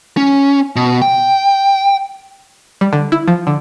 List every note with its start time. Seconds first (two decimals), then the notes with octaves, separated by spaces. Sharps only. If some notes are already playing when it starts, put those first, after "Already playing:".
0.17 C#4
0.76 B2
1.02 G5
2.81 G3
2.93 D3
3.12 E4
3.28 F3
3.47 D3